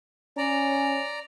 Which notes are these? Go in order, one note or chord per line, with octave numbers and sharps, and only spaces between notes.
C#4 D5 A#5